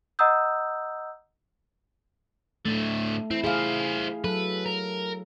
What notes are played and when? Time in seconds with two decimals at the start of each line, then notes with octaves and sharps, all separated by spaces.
0.19 D#5 F#5 A#5 D#6 E6 G6
2.66 A2 D3 A3
3.31 C4 E4
3.44 E4 G#4 C5 F5
4.24 F#3 A4 B4
4.66 A#4